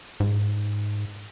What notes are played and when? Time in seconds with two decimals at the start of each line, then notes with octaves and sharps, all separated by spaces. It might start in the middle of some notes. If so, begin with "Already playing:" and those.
0.20 G#2